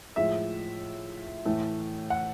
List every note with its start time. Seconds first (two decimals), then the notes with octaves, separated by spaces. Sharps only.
0.16 A2 F3 G#3 E5
1.45 A2 E3 A3
2.10 F#5